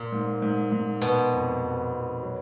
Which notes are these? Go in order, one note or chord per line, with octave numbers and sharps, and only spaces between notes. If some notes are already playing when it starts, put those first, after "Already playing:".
Already playing: A#2 A#3
G#2
G#2
G#2
B2 B3
F2
F2
F2
F#3